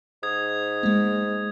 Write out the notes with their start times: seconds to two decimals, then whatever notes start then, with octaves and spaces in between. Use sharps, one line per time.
0.23 G#2 D#6 G#6
0.83 G#3 A#3